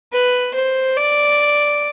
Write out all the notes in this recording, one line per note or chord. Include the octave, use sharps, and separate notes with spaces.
B4
C5
D5